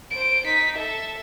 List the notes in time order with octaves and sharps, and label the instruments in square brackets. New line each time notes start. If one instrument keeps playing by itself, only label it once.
[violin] C5 D7
D#4 B6
A4 E5